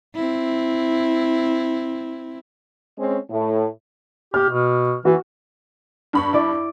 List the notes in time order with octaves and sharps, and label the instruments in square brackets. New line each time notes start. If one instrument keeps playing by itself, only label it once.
[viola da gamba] C4 E4
[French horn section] G#3 C4 C#4
A2
[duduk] G4 [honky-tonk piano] F6
[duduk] B2
[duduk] E3 [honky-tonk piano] F#4
[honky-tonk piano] G2 B5 C#6
[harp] E4 D5 D6